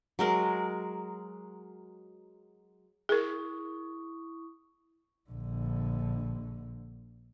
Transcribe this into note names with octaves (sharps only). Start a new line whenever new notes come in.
F#3 G#3 A#4
E4 G#4 A#4 C#6 D#6
A#1 D3